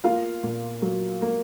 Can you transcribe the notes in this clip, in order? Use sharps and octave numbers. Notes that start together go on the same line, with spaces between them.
A#3 F4 F5
A#2
F#3
A#3